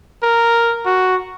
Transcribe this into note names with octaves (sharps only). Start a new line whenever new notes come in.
A#4
F#4